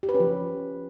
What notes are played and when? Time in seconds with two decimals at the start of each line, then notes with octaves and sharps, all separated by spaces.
0.03 G4
0.09 B4
0.14 C#4
0.20 F3